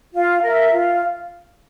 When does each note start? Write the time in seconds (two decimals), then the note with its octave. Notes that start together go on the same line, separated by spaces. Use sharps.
0.14 F4
0.43 A#4 E5
0.73 F4